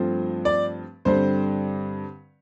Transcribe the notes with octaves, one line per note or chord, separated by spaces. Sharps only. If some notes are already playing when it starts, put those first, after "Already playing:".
Already playing: G2 F3 A3 C4
D5
G2 D3 G3 C4 C5